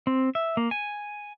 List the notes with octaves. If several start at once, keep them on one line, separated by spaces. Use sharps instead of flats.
C4
E5
A#3
G#5